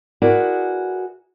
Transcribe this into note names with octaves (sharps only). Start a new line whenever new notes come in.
E4 F#4 G#4 A#4 B4 D5